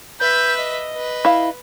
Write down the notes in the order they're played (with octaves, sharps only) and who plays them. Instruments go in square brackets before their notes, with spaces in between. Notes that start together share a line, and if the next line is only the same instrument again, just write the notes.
[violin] B4 E5 [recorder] G6
[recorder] D#5
[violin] B4
[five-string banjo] E4 F5